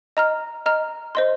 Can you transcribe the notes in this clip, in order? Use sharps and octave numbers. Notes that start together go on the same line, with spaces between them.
D#5 A#5 F6
D#5 A#5 F6
C5 D#5 C6